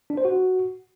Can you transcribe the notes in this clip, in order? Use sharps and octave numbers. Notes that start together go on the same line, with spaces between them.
D4
C5
F#4